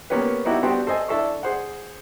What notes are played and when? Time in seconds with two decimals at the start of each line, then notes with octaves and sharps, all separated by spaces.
0.10 A#3 B3 C#4 G4 B4
0.45 B3 D#4 E4 F#4 G4
0.63 G3 B3 C4 D4 F#4 G4
0.87 A4 C5 D#5 G#5
1.08 D4 E4 A4 E5 C#6
1.43 G#4 C5 F#5